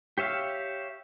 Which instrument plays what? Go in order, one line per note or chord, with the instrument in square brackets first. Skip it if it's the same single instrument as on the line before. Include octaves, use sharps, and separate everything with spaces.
[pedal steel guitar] G4 C#5 E5 F5